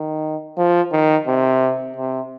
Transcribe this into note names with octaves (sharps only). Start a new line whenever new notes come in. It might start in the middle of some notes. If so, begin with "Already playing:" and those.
Already playing: D#3
F3
D#3
C3
C3